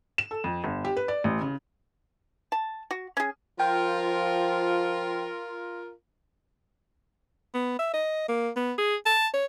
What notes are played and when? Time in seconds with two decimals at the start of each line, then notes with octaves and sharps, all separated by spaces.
0.18 E7
0.31 A4
0.44 F2
0.64 G1
0.85 G4
0.97 B4
1.08 D5
1.24 A1
1.41 C#3
2.52 A5
2.91 F#4
3.17 C#4 G#4
3.60 F3 F4 A#4 G5
7.54 B3
7.79 E5
7.93 D#5
8.28 A#3
8.56 B3
8.78 G#4
9.06 A5
9.34 C#5